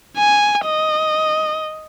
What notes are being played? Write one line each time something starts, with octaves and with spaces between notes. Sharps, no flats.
G#5
D#5